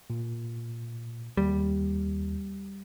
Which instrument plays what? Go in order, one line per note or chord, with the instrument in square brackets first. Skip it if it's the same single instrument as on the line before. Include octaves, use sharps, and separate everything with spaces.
[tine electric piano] A#2
[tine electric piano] D#2 [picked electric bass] G3